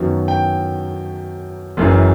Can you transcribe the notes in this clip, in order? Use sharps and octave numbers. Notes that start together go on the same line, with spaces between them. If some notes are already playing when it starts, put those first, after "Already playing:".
Already playing: F#2 D#3 F#3 B3
G5
F#1 F#2 E3